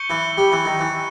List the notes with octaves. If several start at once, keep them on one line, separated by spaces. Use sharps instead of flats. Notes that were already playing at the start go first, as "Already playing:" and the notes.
Already playing: C#6 G6 C#7 G7
E3
G3
E3
D#3
E3